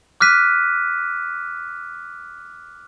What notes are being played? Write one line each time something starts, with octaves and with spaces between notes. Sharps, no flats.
D6 F6 F#6 B6 D#7